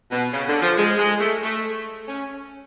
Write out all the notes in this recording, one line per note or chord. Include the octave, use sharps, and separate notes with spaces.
B2
C#3
D3
F3
G#3
G#3
A3
A3
C#4